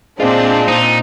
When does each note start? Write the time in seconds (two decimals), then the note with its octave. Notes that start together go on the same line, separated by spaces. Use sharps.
0.20 A#2 G#3 C4 D4 F4
0.68 D#4